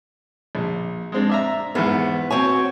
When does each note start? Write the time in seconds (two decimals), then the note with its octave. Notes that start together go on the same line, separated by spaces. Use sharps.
0.55 A#1
1.12 G#3 C4 D4
1.29 D5 E5 A#5
1.75 E2 G#2 B3
2.30 C4 F#4 C#5 G#5